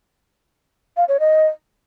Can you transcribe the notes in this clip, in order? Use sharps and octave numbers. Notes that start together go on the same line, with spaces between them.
F5
C#5
D#5